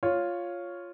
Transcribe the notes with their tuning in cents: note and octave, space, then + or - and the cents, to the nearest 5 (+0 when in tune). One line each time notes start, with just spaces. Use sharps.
F4 +0 C#5 +0